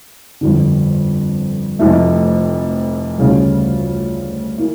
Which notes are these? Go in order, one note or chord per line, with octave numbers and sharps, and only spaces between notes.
G1 F2 D3
F1 F2 E3 A3
D2 C#3 G3 C#4 F4
E3 A#3